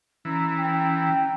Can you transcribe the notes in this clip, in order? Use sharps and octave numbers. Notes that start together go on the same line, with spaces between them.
E3 C#4 A#5
G5